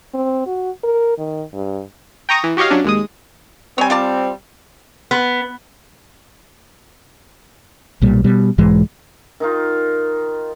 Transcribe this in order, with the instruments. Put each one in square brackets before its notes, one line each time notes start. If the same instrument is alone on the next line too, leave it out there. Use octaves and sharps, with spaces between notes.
[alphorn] C4
F#4
A#4
D#3
G2
[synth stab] G5 A#5 C#6 D#6 A#6
E3
F#4 G4 C#5 D#5 F5
F#3 C#4 D4
D#2 G#3 D#6
[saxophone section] G3 C4 [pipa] C#5 G#5
[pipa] F4 D5 A5
[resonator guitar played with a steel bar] B3
[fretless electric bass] B1 A#2 G3
B2 G3
B1 G#2 E3 G#3
[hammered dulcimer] D#3 D#4 F4